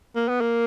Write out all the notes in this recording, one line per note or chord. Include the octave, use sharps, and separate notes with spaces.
A#3
B3
A#3